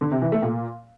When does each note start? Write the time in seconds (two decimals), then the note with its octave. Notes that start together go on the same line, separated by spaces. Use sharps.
0.01 D3
0.11 C3
0.22 E3
0.32 A3
0.42 A#2